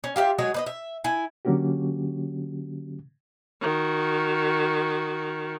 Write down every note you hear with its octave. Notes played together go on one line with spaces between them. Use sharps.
C#4
F4 G4 C5 E5
F#3 G#3 G#4 C#5
B4 D5 D#5
E5
E4 G#5
D3 F#3 A#3 C#4 F#4 G4
D#3 F#4